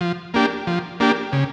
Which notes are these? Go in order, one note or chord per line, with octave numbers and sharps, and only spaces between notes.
F3
A#3 D4 G4
F3
A#3 D4 G4
C#3